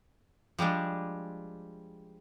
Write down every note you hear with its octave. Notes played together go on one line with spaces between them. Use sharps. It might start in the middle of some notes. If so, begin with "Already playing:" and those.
F3 G3 G#3 D4